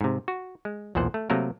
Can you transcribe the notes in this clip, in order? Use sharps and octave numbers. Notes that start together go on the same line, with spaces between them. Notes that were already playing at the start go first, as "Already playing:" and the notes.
G#2 C3
F#4
G#3
B1 E2 A#2 C5 F#5
A3
C3 F#3 A3 A#3 A#4